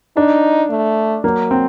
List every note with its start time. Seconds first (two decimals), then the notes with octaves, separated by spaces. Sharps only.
0.16 D4 D#4
0.70 A3
1.24 F#3 A#3
1.51 C4